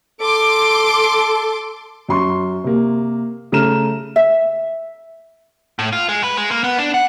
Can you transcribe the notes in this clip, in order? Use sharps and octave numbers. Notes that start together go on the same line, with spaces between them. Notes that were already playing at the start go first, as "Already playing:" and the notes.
A4 C6 D6
F#2 C6 C#6
C3 A#3
C#3 A3 A#5 F6 E7
E5
A2
F4
G#3
B4
G#3
A#3
B3
D4
F#5